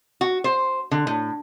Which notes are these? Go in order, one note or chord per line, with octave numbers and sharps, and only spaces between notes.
F#4
C5
D3
A2